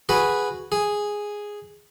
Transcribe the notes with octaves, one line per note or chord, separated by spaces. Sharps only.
F#4 G#4 B4
G#4